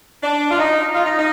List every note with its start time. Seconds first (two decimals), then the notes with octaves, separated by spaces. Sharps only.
0.22 D4
0.49 F4
0.59 D#4
0.94 F4
1.05 D#4
1.18 D#4